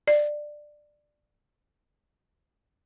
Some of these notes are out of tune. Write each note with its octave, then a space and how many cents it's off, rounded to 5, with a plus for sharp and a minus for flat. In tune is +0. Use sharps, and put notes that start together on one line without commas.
D5 +15